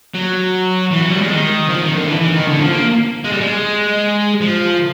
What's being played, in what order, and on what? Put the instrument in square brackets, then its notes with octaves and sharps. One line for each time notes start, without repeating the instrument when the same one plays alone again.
[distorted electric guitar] F#3
E3
F#3
G3
G#3
D#3
F3
D#3
D3
E3
E3
D#3
D3
F3
A#3
G#3
G3
G#3
F3